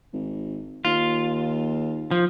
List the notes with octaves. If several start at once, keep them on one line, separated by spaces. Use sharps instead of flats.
G#1
D#2 F4
F3